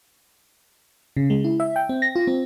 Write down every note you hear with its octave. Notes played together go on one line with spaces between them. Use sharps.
C#3
G#3
E4
E5
G5
C4
A#6
F4
C4